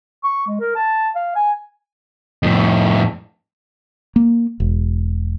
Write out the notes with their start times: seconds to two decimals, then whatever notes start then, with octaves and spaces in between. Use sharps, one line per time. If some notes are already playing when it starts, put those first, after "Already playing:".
0.24 C#6
0.47 G#3
0.60 A#4
0.76 A5
1.16 F5
1.35 G#5
2.43 F2 A2
4.16 A#3
4.60 E1